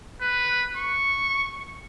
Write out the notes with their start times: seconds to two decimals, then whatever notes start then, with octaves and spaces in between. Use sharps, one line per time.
0.21 B4
0.77 C#6